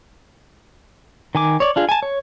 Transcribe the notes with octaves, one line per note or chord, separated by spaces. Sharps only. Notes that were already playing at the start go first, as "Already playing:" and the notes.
D#3 G#5 D6
C#5 D5
D4 F4 G#4
G#5 A5
C#5